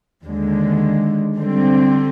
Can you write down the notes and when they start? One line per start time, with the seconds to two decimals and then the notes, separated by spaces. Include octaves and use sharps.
0.24 D#2 D3 G#3
1.37 D3 G3 C4